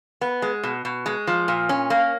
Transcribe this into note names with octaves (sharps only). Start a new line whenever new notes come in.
B3
G#3
B2
B2
G#3
F3
A#2
C#4
A#3